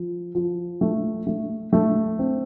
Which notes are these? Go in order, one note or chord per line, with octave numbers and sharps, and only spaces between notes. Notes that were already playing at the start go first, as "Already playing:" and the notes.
Already playing: F3
F3
A3
A3
A3
C4